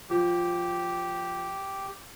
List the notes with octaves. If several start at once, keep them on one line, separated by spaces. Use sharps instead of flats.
F3 G4